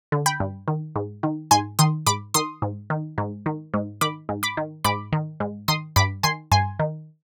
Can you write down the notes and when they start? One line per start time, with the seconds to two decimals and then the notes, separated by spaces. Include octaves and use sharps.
0.12 D3
0.26 G5 B5
0.40 G2
0.68 D#3
0.96 G#2
1.23 D#3
1.51 G#2 G#5 C6
1.79 D#3 C6 D#6
2.07 G#2 B5 D6
2.34 D#3 C6 D#6
2.62 G#2
2.90 D#3
3.18 G#2
3.46 D#3
3.74 G#2
4.01 D#3 B5 D6
4.29 G#2
4.43 B5 D6
4.57 D#3
4.84 G#2 B5 D6
5.13 D#3
5.40 G#2
5.68 D#3 C6 D#6
5.96 G2 B5 D6
6.23 D#3 G#5 C6
6.51 G2 G#5 C6
6.79 D#3